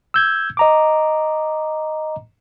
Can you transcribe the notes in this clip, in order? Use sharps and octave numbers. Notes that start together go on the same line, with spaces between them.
E6 G6 G#6
D#5 A#5 D6